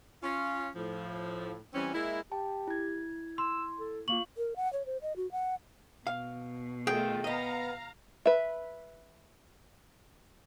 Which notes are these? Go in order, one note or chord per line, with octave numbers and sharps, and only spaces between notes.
C#4 F4
A2 F3
E3 G3 C4 C#4
G#3 A#3 E4
G4 G5 A5
E4 G#6
C6 E6
A4
A#3 F4 F5 C#6 F#7
A#4
F#5
C#5
C5
D#5
F#4
F#5
B2 F5
D#3 A3 F4 G#4 G5
B3 D#5 F5 A#5
B4 E5